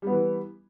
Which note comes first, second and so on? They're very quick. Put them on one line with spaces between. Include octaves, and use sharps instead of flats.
G3 B3 E3